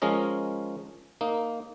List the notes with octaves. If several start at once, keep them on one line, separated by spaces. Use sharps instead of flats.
F3 G#3 C#4 A#4 D#5
A#3 D#4